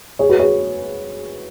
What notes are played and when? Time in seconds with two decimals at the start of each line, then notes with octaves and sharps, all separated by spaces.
0.19 G#4 C#5
0.29 F#4 B4
0.39 G#4 C#5